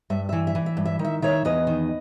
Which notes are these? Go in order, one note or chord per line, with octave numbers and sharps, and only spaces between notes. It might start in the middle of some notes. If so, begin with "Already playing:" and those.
G2 E5
E3 E5
E5
E3
E5
G2
E5
D#3
E5
D#3 C#5 E5
E2 B4 D#5
D#3